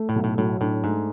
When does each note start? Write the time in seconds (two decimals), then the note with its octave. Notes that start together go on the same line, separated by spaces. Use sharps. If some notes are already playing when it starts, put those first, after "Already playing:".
Already playing: A3
0.09 A2
0.16 B1
0.24 A2
0.38 A2 F#3
0.61 A2 D4
0.84 G#2 A3